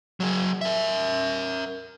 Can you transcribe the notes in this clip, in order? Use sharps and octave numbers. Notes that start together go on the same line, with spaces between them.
F#3 G#4
A#4 E5